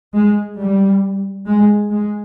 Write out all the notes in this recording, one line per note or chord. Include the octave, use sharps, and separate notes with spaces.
G#3
G3
G#3
G#3